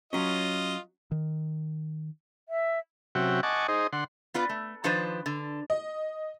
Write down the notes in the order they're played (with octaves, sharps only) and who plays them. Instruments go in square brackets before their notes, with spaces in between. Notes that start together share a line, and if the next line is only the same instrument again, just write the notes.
[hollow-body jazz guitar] F#3 C#4 [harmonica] F4 D#5
[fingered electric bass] D#3
[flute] E5
[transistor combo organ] C3 F#3 C#4 F#4 E5 G5
D#5 F#5 G#5 A5 C#6 D6
D#4 G#4 C5 D#5
D3 F#5 C6
[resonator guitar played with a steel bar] B3 F4 B4 D5
A3
D#3 F3 D4 B4 C5
D3
[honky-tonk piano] D#5